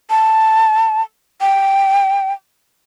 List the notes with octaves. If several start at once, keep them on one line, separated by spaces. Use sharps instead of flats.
A5
G5